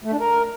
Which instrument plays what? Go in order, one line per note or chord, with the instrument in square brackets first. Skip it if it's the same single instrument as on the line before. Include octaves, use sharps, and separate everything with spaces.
[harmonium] A3
D4
A#4